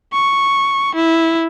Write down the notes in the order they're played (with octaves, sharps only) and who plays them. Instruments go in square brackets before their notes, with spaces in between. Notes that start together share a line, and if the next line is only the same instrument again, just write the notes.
[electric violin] C#6
E4